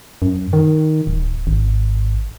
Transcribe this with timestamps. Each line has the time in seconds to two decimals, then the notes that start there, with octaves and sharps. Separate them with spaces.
0.22 F#2
0.53 D#3
1.07 D1
1.47 G#1